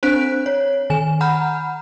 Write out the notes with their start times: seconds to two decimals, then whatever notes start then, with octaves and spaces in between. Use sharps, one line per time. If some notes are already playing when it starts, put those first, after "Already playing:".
0.03 C4 D4 C5 F#6 B6 D7
0.46 C#5
0.90 D#3 G#5 E7
1.21 F#5 A#5 B5 F6 G6